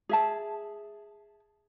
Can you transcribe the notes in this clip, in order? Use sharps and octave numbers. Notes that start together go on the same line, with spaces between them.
G#4 E5 A5